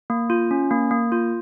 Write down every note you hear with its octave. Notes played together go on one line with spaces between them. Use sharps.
A#3
F4
C#4
A#3
A#3
F4